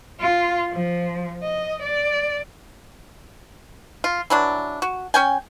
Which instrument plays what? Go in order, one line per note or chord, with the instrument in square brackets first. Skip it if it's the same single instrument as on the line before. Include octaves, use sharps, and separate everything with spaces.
[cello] F4
F3
D#5
D5
[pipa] F4
E3 F#3 D4
F#4
C#4 G5 G#5